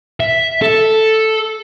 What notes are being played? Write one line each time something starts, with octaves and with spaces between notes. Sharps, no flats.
E5
A4